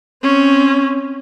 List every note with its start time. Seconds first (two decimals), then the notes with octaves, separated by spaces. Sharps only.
0.23 C4 C#4